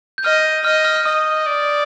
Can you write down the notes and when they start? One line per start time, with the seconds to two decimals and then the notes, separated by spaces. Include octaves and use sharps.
0.18 G6
0.24 D#5 F6
0.65 D#5 F6
0.85 F6
0.96 F6
1.05 D#5 D#6
1.46 D5